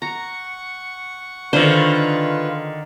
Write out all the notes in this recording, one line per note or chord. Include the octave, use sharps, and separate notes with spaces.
F#5 A#5 C#6
D3 D#3 D4 F4 A4 B4 C5